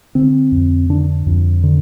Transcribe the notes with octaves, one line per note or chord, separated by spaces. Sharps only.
D3 C4
F2
D3 D4
F2
D3